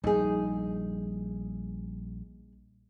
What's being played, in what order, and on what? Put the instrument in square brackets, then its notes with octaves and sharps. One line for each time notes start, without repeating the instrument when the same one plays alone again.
[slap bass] A#1 G3 [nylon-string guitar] D#4 G#4